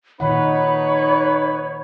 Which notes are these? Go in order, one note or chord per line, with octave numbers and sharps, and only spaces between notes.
A#2 D#3 D#4 B4 C#5 F#5 B5